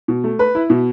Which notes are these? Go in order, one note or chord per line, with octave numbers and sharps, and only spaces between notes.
B2
A3
B4
E4
B2